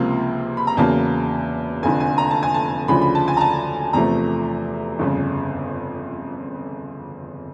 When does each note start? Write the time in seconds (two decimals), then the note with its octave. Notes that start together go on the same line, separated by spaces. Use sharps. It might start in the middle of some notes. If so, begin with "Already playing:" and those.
Already playing: C#2 C3 F3 A#3
0.57 B5
0.67 A#5
0.77 E2 C#3 F#3 A#3 A5
1.83 F1 F2 D3 G#5
2.00 G#5
2.18 A#5
2.31 A5
2.43 G#5
2.54 A5
2.88 D2 C#3 F3 B5
3.02 B5
3.15 A5
3.28 G#5
3.37 A#5
3.41 A5
3.93 E2 C3 F3 A3 A#5
4.99 G1 F2 C#3